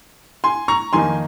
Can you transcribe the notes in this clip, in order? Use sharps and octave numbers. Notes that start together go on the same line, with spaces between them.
G#5 C6
A#5 C#6
F2 D#3 A#3 D#4 G#5 C6